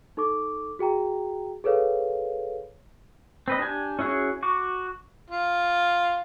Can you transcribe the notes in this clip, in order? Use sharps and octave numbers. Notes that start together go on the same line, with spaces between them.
D#4 A4 C#6 D6
F#4 G#4 G5 A#5
G#4 A4 B4 C#5 F5
C4 B4 D#5
D4 G4 G#5
C#4 E4 F#4 G#4 C#5
F#4 C#6 D6
F4